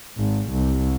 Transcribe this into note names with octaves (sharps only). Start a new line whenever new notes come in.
G#1
C2